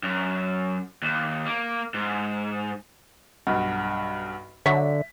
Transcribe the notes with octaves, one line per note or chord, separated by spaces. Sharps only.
F#2
D#2
A#3
G#2
B1 G2 F#5
D3 F#3 C#5 E5 B6